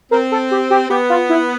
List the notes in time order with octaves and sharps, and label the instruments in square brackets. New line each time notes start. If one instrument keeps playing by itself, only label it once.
[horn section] C4 [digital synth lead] A#4
[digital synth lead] A4
G4
G4
[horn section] B3 [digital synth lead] G4
[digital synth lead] F4
E4